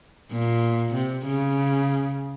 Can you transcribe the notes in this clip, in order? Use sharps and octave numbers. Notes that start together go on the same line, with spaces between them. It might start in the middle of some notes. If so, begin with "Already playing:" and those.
A#2
C3
C#3